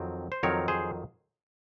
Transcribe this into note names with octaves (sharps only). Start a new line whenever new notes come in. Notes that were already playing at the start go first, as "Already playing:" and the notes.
Already playing: F2 D#3 F#3 C4
C5
F2 D#3 F#3 C4 A#4 C#5
G#4 C5